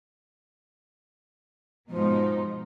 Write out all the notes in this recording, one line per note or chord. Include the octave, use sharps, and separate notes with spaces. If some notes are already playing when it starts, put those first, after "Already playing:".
G#2 B2 F3 D#4